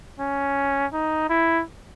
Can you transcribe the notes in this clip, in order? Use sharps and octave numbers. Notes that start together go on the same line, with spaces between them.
C#4
D#4
E4